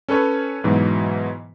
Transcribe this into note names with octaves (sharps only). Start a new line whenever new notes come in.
C#4 A4 B4 C#5
G#2 B2 E3 F#3